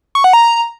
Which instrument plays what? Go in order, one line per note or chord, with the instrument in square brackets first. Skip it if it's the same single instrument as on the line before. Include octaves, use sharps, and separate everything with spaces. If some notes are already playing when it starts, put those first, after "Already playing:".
[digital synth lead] C#6
F#5
A#5